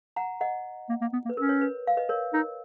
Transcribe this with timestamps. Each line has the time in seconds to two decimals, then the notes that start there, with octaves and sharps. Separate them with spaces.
0.16 F#5 A#5
0.41 D#5 F#5
0.89 A#3
1.01 A#3
1.13 B3
1.25 A#3
1.29 B4
1.37 C#4 A#4
1.49 C#5
1.61 B4
1.87 F5
1.97 B4 D#5
2.09 A#4 C#5
2.33 D#4 A#4